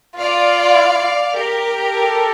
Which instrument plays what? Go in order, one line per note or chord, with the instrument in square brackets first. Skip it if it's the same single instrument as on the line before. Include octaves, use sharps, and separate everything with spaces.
[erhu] F4 [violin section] D5 F5
[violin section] G4 A#4
[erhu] A4